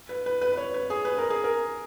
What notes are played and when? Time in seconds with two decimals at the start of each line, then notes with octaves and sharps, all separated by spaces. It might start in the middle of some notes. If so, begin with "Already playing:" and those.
0.09 B4
0.26 B4
0.41 B4
0.52 B4
0.57 C#5
0.74 B4
0.90 G#4
1.05 B4
1.18 A#4
1.30 G#4
1.44 A#4